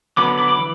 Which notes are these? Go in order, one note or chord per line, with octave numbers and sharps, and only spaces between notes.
D3 F#3 B3 B5 D6
B5 D6
B5 D6
E3